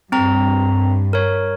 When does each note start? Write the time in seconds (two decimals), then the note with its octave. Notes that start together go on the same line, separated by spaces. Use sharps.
0.12 G2 C4 A#5
1.13 A#4 C#5